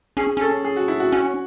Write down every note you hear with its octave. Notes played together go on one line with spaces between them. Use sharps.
C#4 G#4
C#4 A4
G#4
F#4
E4
F#4
C#4 F#4